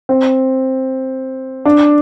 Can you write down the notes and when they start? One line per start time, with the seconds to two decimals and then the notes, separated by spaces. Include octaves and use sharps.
0.09 C4
1.65 D4